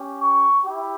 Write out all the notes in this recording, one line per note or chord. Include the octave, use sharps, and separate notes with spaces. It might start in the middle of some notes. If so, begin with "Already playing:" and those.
Already playing: C#4 G4
C#6
E4 G4